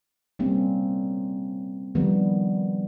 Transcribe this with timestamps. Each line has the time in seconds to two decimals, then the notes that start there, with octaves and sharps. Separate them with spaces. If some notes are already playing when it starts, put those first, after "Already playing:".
0.39 G3 A#3 C4 C#4
1.95 D#3 F3 G3 B3